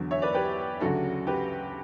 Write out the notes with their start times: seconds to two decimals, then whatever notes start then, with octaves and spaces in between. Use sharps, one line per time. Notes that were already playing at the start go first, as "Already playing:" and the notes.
Already playing: E2 D3 F#3
0.11 C#5 E5
0.22 B4 D5
0.34 G4 B4
0.80 D2 C#3 F#3 F#4 A4
1.27 G4 B4